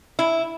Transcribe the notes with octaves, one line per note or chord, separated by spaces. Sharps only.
E4